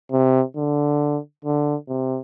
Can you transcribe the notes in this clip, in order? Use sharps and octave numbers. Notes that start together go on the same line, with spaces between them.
C3
D3
D3
C3